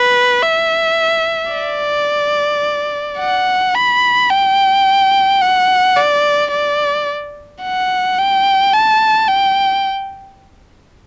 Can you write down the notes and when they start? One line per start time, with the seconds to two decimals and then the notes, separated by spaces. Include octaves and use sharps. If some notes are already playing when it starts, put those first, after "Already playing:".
Already playing: B4
0.43 E5
1.53 D5
3.19 F#5
3.75 B5
4.30 G5
5.41 F#5
5.96 D5
6.52 D5
7.62 F#5
8.18 G5
8.73 A5
9.28 G5